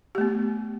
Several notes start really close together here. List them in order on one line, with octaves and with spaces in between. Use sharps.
G4 A3 B3